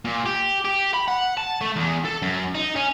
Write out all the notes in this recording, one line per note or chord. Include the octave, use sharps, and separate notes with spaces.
A#2
G4
G4
B5
F#5
A5
A3
E2
A4
F#2
D#4
C#4